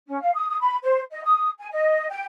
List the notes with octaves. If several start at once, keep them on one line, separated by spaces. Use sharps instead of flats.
C#4
F5
D#6
D#6
B5
C5
D#5
D#6
G#5
D#5
G5